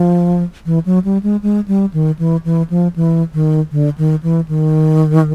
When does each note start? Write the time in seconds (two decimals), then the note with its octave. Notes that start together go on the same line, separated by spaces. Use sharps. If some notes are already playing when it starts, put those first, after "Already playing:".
Already playing: F3
0.66 E3
0.86 F#3
1.04 G3
1.23 G#3
1.43 G#3
1.68 G3
1.94 D#3
2.19 E3
2.45 E3
2.70 F3
2.96 E3
3.34 D#3
3.72 D3
3.98 D#3
4.23 E3
4.48 D#3